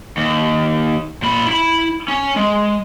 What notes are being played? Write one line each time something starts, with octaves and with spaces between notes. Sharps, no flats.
D#2
A#2 B5
E4 B5
C#4
G#3